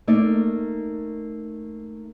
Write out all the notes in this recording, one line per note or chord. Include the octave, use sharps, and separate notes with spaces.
A3 A#3 D#4 D5